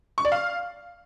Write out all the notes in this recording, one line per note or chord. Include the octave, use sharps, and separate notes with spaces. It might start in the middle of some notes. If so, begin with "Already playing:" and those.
C#6
D5
F5